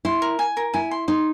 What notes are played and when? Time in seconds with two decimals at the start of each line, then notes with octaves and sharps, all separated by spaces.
0.05 E4 C6
0.22 A#4
0.39 G#5
0.57 A#4
0.74 E4 G#5
0.91 C6
1.08 D#4 C6